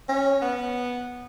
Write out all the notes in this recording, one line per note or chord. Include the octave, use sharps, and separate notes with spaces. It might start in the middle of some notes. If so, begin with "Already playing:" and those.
C#4
B3